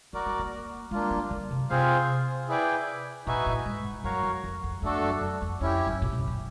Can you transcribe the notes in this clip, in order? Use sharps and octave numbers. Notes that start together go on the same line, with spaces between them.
A#3 F#4 A#4 D5
A3
A#3
G#3 A#3 D4 F4
G3
D3
C3
C3 C4 F4 G#4 C5 F5
E4 G#4 B4 D5 G5
A#2 D#4 F#4 B4 E5 G#5
A2
G#2
F#2 F#4 A#4 C#5 F5
F2
F2
F2
F2 A3 D4 F#4 A4
F#2
F#2
F2
F2 C#4 E4 G4
F#2
A#2
B2
A#2